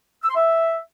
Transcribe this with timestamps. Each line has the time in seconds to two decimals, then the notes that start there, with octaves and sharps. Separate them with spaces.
0.23 E6
0.29 C6
0.35 E5